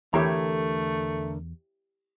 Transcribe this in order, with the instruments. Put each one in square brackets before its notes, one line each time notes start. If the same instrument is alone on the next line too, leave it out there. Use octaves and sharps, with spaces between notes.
[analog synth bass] E2 [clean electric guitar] D3 A#4 A#5 [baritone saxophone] A3 [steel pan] E4 G4 C#5